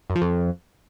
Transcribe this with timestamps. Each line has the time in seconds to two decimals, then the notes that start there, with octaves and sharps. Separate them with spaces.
0.10 F#2
0.16 F3
0.22 F2